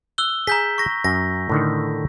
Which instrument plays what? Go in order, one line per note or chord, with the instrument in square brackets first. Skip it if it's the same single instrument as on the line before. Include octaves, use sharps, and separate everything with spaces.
[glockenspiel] E6 F#6 G7
[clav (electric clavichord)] G#4 [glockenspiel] A#5 G6 B6
[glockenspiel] C#6 A#6
[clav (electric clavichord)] F#2 [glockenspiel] A#6
[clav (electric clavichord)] A2 D3 D#3